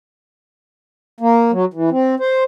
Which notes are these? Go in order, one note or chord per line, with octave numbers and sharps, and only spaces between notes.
A#3
F#3
E3
C4
C5